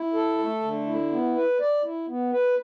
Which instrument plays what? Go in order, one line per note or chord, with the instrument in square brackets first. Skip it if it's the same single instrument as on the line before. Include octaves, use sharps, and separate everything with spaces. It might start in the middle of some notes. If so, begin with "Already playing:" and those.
Already playing: [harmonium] E4
A4
A3
D3
E4
B3
B4
D5
E4
B3
B4